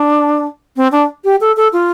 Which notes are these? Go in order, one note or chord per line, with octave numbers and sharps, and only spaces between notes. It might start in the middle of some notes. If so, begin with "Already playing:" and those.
Already playing: D4
C4
D4
G4
A4
A4
F4